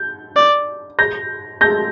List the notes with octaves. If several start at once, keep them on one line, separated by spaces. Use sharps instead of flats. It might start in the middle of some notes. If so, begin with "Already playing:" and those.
Already playing: G6
D5
G6 A#6
G6 A#6